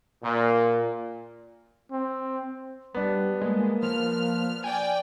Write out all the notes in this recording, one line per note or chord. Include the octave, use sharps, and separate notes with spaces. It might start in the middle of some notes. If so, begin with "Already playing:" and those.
A#2
C4
G3 B3 D4
G#3 A#3
F3 F6
D5 G5 G#5